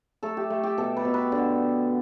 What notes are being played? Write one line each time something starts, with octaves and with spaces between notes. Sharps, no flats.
A3 A4
G4
A3
G4
B2 A4
B4
B2
B4
D3